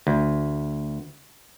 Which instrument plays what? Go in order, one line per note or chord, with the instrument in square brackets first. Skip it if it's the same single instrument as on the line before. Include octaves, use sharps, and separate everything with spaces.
[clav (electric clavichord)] D2